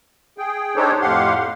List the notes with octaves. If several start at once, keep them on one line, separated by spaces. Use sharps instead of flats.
G#4 G5
D4 D#4 G4 A4 C5 C#5
F2 A2 G4 F5 F#5 C6